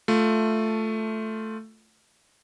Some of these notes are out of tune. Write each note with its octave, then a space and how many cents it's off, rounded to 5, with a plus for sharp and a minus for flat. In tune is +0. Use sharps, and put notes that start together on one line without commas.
A3 +0 F4 +5